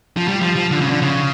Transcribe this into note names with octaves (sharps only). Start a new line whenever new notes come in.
F3
G3
F3
F3
D3
C#3
D3
C#3